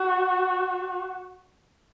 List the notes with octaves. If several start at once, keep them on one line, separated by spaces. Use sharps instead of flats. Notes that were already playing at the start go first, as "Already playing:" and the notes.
Already playing: F#4